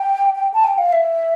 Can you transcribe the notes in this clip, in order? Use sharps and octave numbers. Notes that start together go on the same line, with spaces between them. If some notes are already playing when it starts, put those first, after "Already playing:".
Already playing: G5
G5
A5
G5
F5
E5